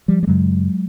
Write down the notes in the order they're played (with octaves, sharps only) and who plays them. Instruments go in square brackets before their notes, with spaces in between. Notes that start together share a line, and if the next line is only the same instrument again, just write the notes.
[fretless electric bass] F3 G3
G3
F#2 C#3 F#3 G#3